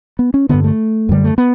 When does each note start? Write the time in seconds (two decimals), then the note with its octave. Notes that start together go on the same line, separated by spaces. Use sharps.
0.19 B3
0.34 C#4
0.49 G2 D3 B3
0.64 A3
1.09 F#2 D3 G3
1.24 A3
1.38 B3